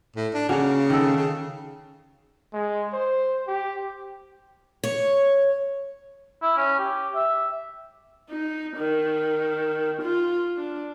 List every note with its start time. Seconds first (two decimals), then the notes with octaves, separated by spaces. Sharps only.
0.16 A2
0.34 D4
0.49 C#3 A#3 C#4 F#4
0.90 D#3 A4
1.17 C#3
2.53 G#3
2.93 C5
3.48 G4
4.84 C#5
6.42 E4
6.57 C#4
6.79 G4
7.15 E5
8.30 D#4
8.77 D#3
10.02 F4
10.57 D4